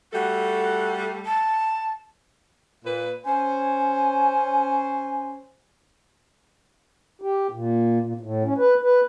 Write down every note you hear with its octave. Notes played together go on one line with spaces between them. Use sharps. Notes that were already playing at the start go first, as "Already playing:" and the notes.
G3 A3 F#4 A4
A5
A#2 B4
C#4 C5 G#5
G4
A#2
A#2
A2
C#4
B4
B4